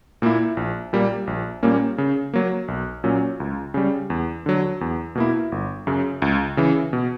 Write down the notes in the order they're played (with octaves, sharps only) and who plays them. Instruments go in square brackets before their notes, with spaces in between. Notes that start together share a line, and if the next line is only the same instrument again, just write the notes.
[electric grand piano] A#2 A#3 E4
A#1
A#2 G3 A#3
A#1
A#2 G3 A#3 C#4
C#3
F#3 A#3
B1
A#2 F#3 C#4
C#2
C#3 G3
E2
D3 F#3
E2
B2 A#3 E4
G1
F#2 C#3
C#2
C#3 E3
B2